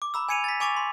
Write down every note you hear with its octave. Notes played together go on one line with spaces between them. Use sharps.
D6
A#5 B5 E6
G#5 G#6 C#7 D#7 F7
A6 B6
G#5 C#6 D6 A6 F7
C6